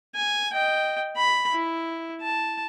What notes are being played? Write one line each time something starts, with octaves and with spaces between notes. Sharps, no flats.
G#5
D#5 G5
B5
E4
A5